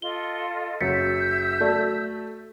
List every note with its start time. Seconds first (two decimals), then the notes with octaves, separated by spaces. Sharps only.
0.02 F4 A4 D#5 G7
0.81 F#1 F#3 E5 E6 G6 A6 B6 C#7
1.61 A3 F#4 D5